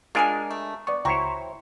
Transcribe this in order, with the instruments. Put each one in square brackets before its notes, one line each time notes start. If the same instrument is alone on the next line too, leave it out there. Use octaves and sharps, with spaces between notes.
[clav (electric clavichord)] G#3 D4 A#4 [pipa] F4 G#4 G#5
[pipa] A3
[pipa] B3 [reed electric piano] D5 C#6
[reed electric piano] C#2 G5 A#5 [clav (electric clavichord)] E4 C5 C#5 [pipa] F#4 C#6